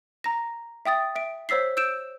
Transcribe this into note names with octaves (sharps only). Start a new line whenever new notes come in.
A#5 A#6
E5 G5 D#6 A6
E5 D7
C5 C#5 E6 B6 C7
E6 G6 D7 E7